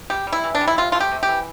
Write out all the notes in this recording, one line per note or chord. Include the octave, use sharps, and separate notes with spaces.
G3 G4
G3
E4
E3
D4
G3
E4
C3 F4
A3 F4
G4
C3
G4
E3